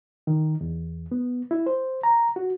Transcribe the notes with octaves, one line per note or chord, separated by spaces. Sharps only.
D#3
E2
B3
E4
C5
A#5
F#4